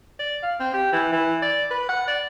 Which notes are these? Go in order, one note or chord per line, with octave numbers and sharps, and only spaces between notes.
D5
F5
C4
G4
E3
E3
D5
B4
F#5
D5